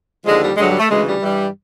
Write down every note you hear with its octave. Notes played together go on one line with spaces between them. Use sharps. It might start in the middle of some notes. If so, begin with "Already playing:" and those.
D#2 D3 F3 G#3
G3
G2 D3 F#3 G#3
G3
A3
D2 C#3 E3 G#3
G3
G2 E3 G3